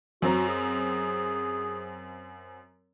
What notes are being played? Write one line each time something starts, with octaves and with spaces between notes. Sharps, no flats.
F#2 C4 F#4 A#5
G#4